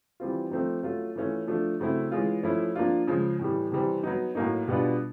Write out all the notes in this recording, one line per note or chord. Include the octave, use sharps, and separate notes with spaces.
E3 G3 C4 F4
F3 A3 C4 D#4
F#3 A3 C#4 F4
E3 A3 C#4 F4
F3 A3 D4 F4
C#3 F#3 A3 C4 E4
E3 G#3 C#4 F4
F3 A3 C#4 E4
F3 A#3 D4 F4
C#3 F3 G#3
A2 E3 G3
C3 E3 G3 C4
F#3 B3 D#4
A2 F#3 A#3 D#4
B2 G3 B3 D4 F4